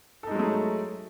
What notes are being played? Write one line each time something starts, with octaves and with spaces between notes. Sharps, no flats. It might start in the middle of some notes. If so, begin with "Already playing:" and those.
F#3 G#3 A3 D#4 A4